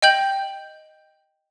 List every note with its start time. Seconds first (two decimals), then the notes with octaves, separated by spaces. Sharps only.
0.02 D#5 G5 G6 F#7